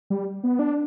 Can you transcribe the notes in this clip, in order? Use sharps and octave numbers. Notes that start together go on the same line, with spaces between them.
G3
B3
D4